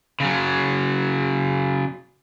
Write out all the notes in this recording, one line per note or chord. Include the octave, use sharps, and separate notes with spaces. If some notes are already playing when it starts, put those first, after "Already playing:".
C#3 F#3